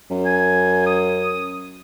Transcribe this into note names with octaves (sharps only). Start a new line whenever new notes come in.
F#2
G#5
D#6